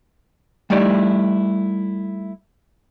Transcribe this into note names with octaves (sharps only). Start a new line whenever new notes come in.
G3 A3 D#4 E4 D5